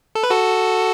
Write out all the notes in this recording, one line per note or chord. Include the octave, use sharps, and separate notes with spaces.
A4
B4
F#4 A4